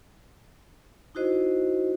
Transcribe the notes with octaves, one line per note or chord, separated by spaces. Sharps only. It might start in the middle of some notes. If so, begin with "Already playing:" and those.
D#4 E4 F#4 C5 D#5